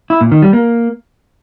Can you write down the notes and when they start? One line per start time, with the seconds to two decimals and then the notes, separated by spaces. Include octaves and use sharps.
0.10 E4
0.21 A#2
0.32 D#3
0.42 G3
0.53 A#3